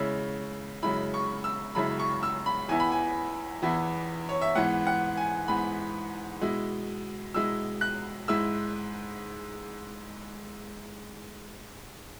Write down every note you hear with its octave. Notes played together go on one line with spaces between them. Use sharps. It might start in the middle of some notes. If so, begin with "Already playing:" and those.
Already playing: C#3 G#3 C#4 E4
F#2 C#3 G#3 E4 B5
C#6
E6
F#2 C#3 G#3 E4 B5
C#6
E6
B5
E2 E3 B3 E4 G#5
B5
G#5
E2 E3 B3 E4
C#5
E5
G#2 E3 B3 F#5
F#5
G#5
G#2 E3 B3 B5
B2 G#3 E4
B2 G#3 E4 E6
F#6
G#2 G#3 E4 E6